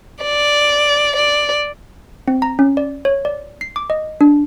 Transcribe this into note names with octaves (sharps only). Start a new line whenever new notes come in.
D5
D5
C4
A#5
C#4
D5
C#5
D5
C7
D6
D#5
D4